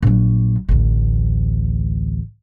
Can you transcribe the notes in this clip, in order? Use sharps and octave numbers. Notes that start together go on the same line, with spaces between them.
A#1 F#3
A1 D2